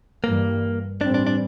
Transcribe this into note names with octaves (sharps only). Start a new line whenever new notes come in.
G2 E3 G3 A#3
A2 E3 G3 C4 D4
D4
D4